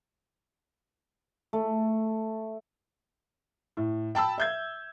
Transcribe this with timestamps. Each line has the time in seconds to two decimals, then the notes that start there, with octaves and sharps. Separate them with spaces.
1.53 A3
3.77 A2
4.15 G5 A5 B5 E6
4.38 E5 G6 G#6